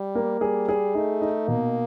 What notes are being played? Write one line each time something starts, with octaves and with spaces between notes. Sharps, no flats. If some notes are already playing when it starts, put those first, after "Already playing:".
Already playing: G3
A#3
G3 G#4
G#4
A3 D#4
D#4
B2 A#3